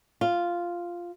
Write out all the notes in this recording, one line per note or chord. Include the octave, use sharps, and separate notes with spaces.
F4